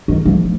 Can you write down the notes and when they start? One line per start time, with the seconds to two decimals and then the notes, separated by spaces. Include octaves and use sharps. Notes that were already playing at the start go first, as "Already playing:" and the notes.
0.08 D#3
0.25 F3